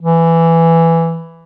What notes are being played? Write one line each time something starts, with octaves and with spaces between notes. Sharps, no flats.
E3